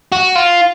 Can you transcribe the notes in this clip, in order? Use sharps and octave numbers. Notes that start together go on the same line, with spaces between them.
F#4
F4